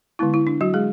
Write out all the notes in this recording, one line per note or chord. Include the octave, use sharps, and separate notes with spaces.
D3 G#3 B3 E4
E4
D4
F#3 F#4
G#3 G#4